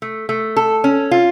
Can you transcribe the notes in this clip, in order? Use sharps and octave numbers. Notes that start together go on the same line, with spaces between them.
A3
A3
A4
C#4
F4